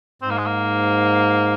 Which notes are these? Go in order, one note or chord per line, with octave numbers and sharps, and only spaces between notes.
G#2 C4
A#3
G#3
A#3